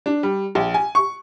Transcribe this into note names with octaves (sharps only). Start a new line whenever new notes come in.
D4
G3
A#1
G#5
C#6